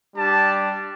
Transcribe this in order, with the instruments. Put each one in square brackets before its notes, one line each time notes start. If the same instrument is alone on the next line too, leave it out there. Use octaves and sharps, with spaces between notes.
[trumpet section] G3 D4 G4 A5